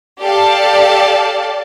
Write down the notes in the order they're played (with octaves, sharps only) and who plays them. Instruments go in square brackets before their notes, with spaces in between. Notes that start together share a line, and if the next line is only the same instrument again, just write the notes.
[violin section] G4 A4 D5 F5 A5